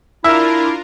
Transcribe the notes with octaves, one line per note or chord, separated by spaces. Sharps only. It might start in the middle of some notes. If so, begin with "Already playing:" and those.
D4 E4 F4 A#4 E5